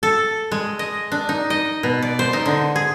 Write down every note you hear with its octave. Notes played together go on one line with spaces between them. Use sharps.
A4
G#3
D#5
D4
D#4
D#5
B2
D5
C5
D#4
D3
G#4